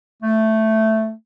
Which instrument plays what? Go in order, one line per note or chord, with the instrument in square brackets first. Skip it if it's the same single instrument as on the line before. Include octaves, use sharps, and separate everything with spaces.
[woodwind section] A3